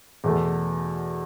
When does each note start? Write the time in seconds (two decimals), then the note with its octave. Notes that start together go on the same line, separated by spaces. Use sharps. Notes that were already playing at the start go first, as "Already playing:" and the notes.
0.24 E2 B2 A3